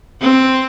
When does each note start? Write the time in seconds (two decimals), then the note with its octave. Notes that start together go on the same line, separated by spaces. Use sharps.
0.22 C4